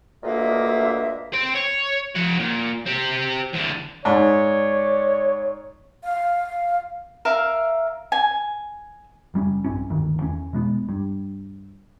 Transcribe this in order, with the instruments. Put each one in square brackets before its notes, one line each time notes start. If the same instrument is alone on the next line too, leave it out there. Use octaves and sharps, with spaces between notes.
[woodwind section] D2 G2 A#2 A#3 D#5 E5
[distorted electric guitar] C5 G5
C#5
F3 F#5
A#2
C4 G4
E2 D3
[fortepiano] G#2 [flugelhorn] C#5 [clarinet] D5
[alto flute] F5
[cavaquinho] A#4 E5 F5
G#5
[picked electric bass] F#1 G3 C#4
A#1 G2 C4 C#4
G1 D2 D#3
E2 C#4
B2 G#3 B3
G2